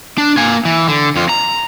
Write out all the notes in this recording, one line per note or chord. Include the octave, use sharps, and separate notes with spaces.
D4
A#3 G#5
E3
D3
F2 F4
A#5